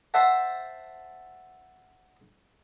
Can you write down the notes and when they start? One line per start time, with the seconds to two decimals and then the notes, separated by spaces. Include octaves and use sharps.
0.14 C5 E5 F#5 A5